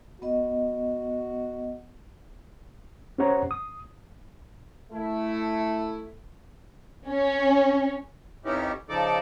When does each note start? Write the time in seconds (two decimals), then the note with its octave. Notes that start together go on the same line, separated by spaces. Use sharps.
0.22 B3 F#4 D#5
3.18 C#4 G4 C5 C#5 F#5 A#5
3.51 D#6
4.93 A3 E4
7.07 C#4
8.45 F2 B3 C#4 D#4 E4 G4
8.89 C#3 F3 D#4 A4 D5 D6